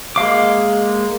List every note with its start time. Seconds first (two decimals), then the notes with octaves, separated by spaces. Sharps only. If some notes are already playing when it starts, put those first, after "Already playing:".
0.16 G#3 A#3 F5 D6